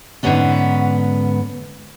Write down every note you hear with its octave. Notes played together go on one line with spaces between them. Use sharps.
G#2 D3 D#3 B3 C#4 D4